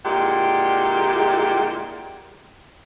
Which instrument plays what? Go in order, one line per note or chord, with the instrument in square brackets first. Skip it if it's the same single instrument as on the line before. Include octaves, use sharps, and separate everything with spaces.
[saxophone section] A#2 D3 G#3 E4 G4